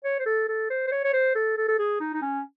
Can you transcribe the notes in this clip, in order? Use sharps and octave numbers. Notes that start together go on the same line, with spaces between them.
C#5
C5
A4
A4
C5
C5
C#5
C#5
C5
A4
A4
A4
G#4
D#4
D#4
C#4